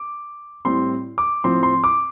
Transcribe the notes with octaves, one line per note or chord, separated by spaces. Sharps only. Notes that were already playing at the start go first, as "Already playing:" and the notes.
Already playing: D6
A2 G3 C4 C6
D6
A2 F3 C4 C6
C6
D6